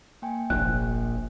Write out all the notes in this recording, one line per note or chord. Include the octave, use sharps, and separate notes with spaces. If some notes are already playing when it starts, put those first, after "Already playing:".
A#3 G5 G#5
F1 A#1 F#6